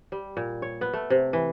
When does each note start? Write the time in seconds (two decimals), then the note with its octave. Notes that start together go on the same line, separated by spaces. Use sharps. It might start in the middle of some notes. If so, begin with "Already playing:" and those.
0.12 G3
0.37 A#2
0.62 C#5
0.81 B3
0.93 A3
1.10 C3
1.33 E3